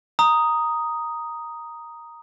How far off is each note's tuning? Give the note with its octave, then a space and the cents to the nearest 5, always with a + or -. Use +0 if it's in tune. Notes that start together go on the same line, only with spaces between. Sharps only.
A#5 +0 D#6 +0